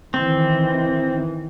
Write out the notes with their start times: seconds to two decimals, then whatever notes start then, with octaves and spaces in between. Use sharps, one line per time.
0.14 D#3 E3 C4